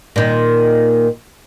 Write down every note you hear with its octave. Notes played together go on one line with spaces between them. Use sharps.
A#2 D#3